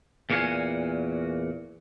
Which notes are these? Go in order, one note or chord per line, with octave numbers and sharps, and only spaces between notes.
E2 A#2 C#4 F#4 F5 G#5